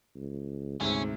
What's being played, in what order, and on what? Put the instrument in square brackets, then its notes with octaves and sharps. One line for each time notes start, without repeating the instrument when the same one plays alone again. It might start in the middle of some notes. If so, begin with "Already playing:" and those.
[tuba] C#2
[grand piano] D2 C3 [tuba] G#2 [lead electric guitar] C#4